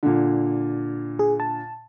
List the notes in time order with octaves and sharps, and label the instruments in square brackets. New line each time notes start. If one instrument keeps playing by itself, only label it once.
[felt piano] A#2 D3
[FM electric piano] G#4
A5